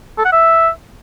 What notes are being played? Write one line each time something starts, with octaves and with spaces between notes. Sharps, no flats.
A4
F#5
E5